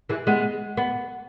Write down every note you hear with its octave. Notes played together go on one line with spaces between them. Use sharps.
E3 G#3
G#3 B3
B3